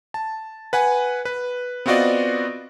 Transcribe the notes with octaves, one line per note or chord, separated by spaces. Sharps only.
A5
B4 F#5 G#5
B4
B3 C4 F4 F#4 D5 D#5